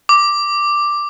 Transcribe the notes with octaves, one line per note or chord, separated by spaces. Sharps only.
D6